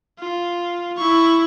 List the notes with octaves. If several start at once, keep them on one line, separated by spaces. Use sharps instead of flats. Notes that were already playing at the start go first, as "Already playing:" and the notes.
F4
E4 C#6